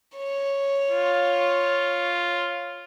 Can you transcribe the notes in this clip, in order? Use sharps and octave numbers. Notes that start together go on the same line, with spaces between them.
C#5
F4